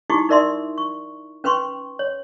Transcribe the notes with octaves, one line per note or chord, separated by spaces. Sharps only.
D#4 E4 F#4 G4 C#6 D6
D#4 A#4 D5 E5 C6 D#6
C#6
C#4 B4 G5 C6 C#6
C#5